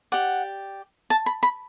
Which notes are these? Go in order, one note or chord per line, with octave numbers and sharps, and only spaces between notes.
G4 D5 F#5
A5
B5
B5